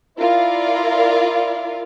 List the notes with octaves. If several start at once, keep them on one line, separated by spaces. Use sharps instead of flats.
E4 F4 A#4 D5 F5